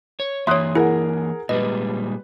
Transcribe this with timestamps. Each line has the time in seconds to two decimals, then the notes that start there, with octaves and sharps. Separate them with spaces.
0.20 C#5
0.47 E3 A#3 C#5 E5 C6 D#6 F#6
0.75 E4 G#4 A#4 F#5
1.49 A#2 G3 G#3 B4 D#5